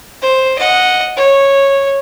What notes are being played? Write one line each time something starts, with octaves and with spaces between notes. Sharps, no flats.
C5
D#5 F#5
C#5